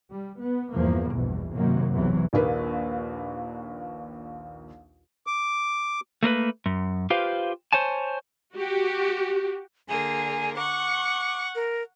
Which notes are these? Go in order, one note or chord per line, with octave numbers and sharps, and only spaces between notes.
G3
B3
E2 G2 F3 A#3
A#1 E2 G2 B2
F#2 C3 D#3 F#3 A#3
B1 E2 C3 E3 F#3
A#1 D#2 A#3 B4
D6
A3 A#3 A#4 B4
F#2
F4 G4 B4 C5 F5
C5 C#5 G#5 A5
F#4 G4
D3 A#3 G#4 G#5
F#5 C#6 D6
A#4